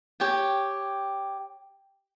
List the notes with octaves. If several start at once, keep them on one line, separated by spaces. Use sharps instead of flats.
G4 C#5 G5